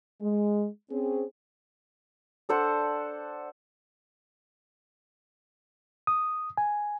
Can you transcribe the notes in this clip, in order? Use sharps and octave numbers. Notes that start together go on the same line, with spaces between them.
G#3
C4 C#4 G#4
D4 A4 C5 F#5
D#6
G#5